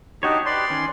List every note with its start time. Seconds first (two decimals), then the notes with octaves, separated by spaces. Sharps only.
0.23 D4 D#4 F#4 G4 C#5
0.46 G4 B4 D5 C6
0.70 D#3 C#4